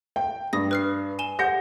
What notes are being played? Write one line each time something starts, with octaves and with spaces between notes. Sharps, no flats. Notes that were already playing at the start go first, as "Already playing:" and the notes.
G5
G2 D#6 A#6
B4 F6 C7
G#5 E7 G7
G4 F#5 G6 A#6